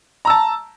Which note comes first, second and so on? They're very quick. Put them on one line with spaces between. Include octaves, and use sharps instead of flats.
A#5 E6 A5